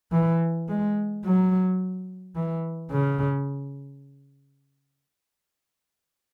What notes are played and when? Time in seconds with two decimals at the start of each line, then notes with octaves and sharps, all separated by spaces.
0.12 E3
0.69 G#3
1.24 F#3
2.35 E3
2.91 C#3